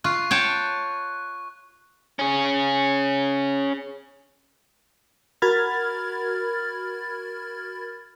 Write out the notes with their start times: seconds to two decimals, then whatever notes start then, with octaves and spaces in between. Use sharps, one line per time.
0.04 F4 C#6 F#6
0.31 C#5 G5 A5
2.19 C#4 G#4
5.42 F#4 A#4 B5 F6 G#6 A6